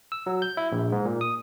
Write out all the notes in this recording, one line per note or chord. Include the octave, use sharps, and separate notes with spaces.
E6
F#3
G6
E4
A#1
G#2
A#2
D#6